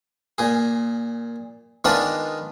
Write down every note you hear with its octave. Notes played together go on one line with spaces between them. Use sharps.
A#2 G#4
D#3 G#3 B3 D4 F4 D5